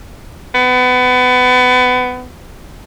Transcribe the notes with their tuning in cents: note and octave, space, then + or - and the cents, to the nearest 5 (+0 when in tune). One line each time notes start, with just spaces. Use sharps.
B3 +25